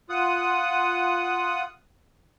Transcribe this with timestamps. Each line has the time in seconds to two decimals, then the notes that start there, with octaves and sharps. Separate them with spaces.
0.09 F4 F#5 D#6